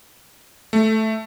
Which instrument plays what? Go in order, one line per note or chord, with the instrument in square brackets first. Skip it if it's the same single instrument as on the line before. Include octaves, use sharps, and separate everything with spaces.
[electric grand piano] A3